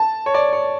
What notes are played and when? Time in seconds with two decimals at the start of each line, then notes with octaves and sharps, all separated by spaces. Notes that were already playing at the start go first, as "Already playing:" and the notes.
Already playing: A5
0.26 C#5
0.34 D5
0.53 C#5